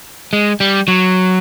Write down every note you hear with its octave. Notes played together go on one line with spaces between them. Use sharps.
G#3
G3
F#3